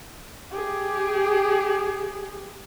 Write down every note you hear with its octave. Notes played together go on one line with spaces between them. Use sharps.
G4 G#4